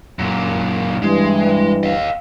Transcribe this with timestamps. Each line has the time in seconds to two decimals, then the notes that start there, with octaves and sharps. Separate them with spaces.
0.19 F#2 A#2
1.02 G2 E3 G#3
1.83 D#5 F5